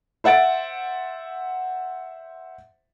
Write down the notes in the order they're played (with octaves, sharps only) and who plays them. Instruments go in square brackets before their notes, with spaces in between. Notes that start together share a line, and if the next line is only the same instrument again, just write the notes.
[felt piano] C5 E5 F#5 A6 D7